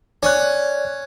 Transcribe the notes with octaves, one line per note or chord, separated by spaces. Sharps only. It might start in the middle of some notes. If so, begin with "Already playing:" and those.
C#4 C#5 D5 F#6